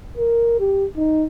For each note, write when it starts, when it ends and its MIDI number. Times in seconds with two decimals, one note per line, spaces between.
0.18 0.59 70
0.59 0.85 67
0.96 1.26 63